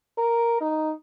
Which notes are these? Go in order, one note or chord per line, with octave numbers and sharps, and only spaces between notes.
A#4
D#4